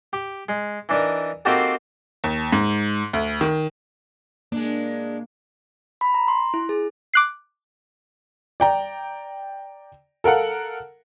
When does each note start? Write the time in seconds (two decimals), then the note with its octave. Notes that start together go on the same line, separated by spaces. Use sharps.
0.13 G4
0.49 G#3
0.89 E3 D4 D#4 A#4
1.45 A#3 C4 D#4 F#4 G4 A4
2.24 D#2
2.52 G#2
3.13 D2
3.41 D#3
4.52 G#3 A#3 D4
6.01 B5
6.14 A#5
6.28 C6
6.54 E4
6.69 G#4
7.14 D6 F#6 C7
8.60 D5 G5 A#5
10.24 A4 A#4 F5 F#5